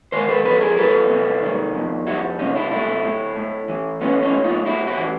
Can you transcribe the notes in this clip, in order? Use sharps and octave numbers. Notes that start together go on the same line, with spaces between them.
D#3 A#4 C5
A4 B4
F2 A4 B4
G#4 A#4
G3 A4 B4
C3
D#3
F2
G3 E4 F#4
C3 C#4 D#4
D4 E4
A3 D4 E4
A2
A2
E3
A3 B3 C#4
C#4 D#4
A2
D#4 F4
A2 E4 F#4
E4 F#4
E3